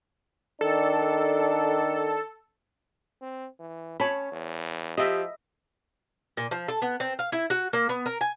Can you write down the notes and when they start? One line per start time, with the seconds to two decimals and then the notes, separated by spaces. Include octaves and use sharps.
0.61 D#3 D4 A4
3.22 C4
3.60 E3
4.00 C#4 C#5 A5 B5
4.32 E2
4.98 F3 G4 D#5 E5
6.37 A#2
6.51 F3
6.68 A4
6.82 B3
7.00 C4
7.19 F5
7.32 E4
7.50 F#4
7.73 A#3
7.89 B3
8.06 A#4
8.21 G#5